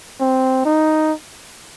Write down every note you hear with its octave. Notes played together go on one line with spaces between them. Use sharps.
C4
D#4